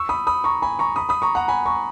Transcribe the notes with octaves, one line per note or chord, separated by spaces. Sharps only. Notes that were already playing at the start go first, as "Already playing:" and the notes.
Already playing: C#6 E6
B5 D#6
B5 D#6
A#5 C#6
G#5 B5
A#5 C#6
B5 D#6
B5 D#6
A#5 C#6
F#5 A#5
G#5 B5
A#5 C#6